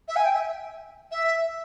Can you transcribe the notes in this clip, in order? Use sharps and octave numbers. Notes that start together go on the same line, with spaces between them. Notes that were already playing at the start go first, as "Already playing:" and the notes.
E5
G#5
G5
E5
E5